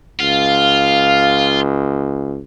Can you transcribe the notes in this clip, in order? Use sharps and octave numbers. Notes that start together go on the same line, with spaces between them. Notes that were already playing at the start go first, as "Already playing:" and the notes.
C#2 F4 F5